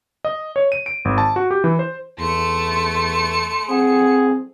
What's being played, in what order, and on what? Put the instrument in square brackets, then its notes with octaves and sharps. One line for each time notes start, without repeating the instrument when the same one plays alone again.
[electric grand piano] D#5
C#5
D#7
D7
G#1
A5
F#4
G4
E3
C5
[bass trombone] E2 [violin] A3 C#7 [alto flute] C6
[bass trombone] C4 [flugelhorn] G#4 [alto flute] F#5